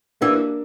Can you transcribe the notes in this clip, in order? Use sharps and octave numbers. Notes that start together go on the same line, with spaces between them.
E3 A#3 D4